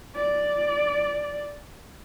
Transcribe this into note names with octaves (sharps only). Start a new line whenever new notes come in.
D5